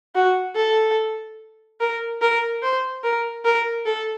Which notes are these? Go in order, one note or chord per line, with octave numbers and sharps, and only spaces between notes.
F#4
A4
A#4
A#4
C5
A#4
A#4
A4